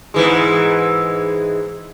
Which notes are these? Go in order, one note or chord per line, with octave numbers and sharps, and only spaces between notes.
G#2 E3 G#3